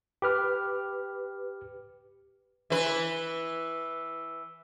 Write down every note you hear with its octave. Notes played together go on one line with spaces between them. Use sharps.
G4 B4 F6
E3 B4